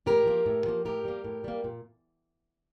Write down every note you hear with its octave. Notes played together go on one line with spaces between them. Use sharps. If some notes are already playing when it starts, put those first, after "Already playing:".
A2 G4 A#4
F3 A#3
A2
F3 A#3
A2 G4 A#4
G3 A#3
A2
G3 A#3
A#2